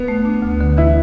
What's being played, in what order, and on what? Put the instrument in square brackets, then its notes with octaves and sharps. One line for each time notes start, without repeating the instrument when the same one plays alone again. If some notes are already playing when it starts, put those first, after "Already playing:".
Already playing: [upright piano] B3
[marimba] A3
D4
D2
D3
[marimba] E3 [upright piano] E4